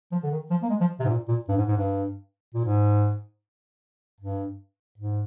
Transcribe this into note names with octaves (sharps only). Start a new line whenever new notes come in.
F3
D3
D#3
F3
A#3
G#3
F3
C3
G#2
A#2
A#2
G2
G#2
G#2
G2
A#2
G#2
G2
G#2